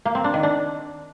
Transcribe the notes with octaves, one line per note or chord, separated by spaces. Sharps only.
A#3
C4
D4
D#3
D4